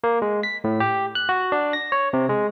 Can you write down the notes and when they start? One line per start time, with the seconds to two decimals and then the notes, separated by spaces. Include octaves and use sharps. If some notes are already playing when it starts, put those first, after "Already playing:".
0.04 A#3
0.22 G#3
0.43 B6
0.64 A2
0.80 G4
1.15 F#6
1.29 F#4
1.52 D4
1.73 A#6
1.92 C#5
2.13 C3
2.29 G#3